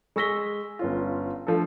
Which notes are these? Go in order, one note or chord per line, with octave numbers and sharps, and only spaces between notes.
G#3 C#6 E6 A#6 B6 G7
G1 C#4 F4
F3 A3 D4 A4